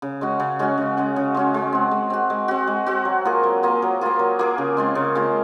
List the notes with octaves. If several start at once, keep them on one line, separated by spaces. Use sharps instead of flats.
C#3
G#3 C#4 F#4
C#3
G#3 C#4 F#4
C#3
G#3 C#4 F#4
C#3
G#3 C#4 F#4
G#3
C4 F#4
G#3
C4 F#4
G#3
C4 F#4
G#3
C4 F#4
F#3
A#3 F4 G#4
F#3
A#3 F4 G#4
F#3
A#3 F4 G#4
F#3
A#3 F4 G#4
C#3
G#3 C4 F4
C#3
G#3 C4 F4